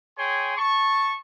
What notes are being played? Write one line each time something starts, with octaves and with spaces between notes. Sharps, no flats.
G#4 C#5 G5 G#5 C6
A5 C#6